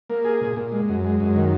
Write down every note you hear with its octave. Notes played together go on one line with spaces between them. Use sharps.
A#3
G#4
A#2
A#2
G#3
F#2
G#3
F#2
D#3